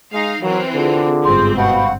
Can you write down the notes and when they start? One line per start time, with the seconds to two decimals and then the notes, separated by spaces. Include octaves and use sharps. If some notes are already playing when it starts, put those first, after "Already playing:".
0.13 G#3 D#4 F5
0.42 E3 F#3 C4 A#4
0.74 D3 F4 G#4 D6
1.24 G1 G#2 C4 C6
1.56 B2 F5 F#5 B5 C#6